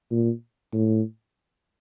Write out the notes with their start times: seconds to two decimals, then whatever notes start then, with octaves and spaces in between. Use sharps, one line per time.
0.11 A#2
0.73 A2